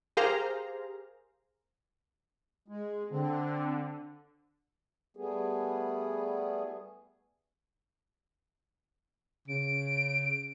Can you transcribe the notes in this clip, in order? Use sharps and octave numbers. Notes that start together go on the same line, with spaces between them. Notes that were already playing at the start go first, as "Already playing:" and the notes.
G4 G#4 A#4 C5 F5 A#5
G#3
D3 C4
G3 A3 B3 G#4
C#3 D7